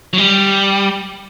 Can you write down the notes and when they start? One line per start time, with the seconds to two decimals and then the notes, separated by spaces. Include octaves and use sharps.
0.13 F#3
0.18 G3